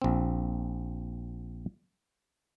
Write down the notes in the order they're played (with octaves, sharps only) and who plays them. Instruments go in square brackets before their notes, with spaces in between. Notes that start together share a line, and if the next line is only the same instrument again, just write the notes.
[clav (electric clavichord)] A#1 C4